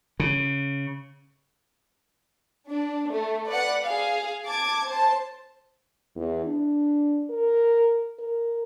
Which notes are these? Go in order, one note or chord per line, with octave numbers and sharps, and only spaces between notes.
C#3
D4
A3
B4 D5 F#5
G#4 F5
A5 D6 G#6
C5 A5
E2
D4
A#4
A#4